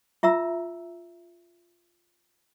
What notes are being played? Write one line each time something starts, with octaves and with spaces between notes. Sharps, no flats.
F4 E5 A#5 E6